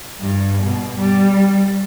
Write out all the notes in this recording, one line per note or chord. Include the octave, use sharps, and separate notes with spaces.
G2
B2
G3